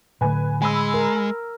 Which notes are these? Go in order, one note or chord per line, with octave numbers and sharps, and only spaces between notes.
A2 D3 A3 B4 G#5
G#3 G#5 B5 E6
A#4